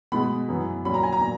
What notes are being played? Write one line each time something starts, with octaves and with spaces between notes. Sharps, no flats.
B2 G#3 B3 B5
F#2 E3 B3
A#2 F#3 C#4 B5
A#5
G#5
A#5
A#2